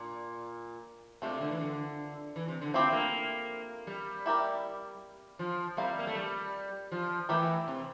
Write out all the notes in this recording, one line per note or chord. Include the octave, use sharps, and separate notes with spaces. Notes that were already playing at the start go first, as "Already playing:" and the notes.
Already playing: A#2 D4
C3 F3 A3 D4
C3
D3
E3
D3
E3
C3
D3
F3 A3 C4 E4 G4
A#3
G3
E4 G4 A#4 D5
F3
G3 C4 E4 A#4 F5
A#3
A3
G3
F3
E3 A3 E4 G4 A#4
C3